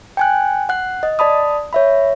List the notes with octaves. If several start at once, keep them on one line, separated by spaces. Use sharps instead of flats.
G5 G#5 F#6
F#5 F#6
D#5
D5 A5 B5 D#6
C#5 E5 B5